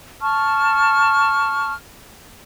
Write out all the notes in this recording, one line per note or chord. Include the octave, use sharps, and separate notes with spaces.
A5 C#6 F6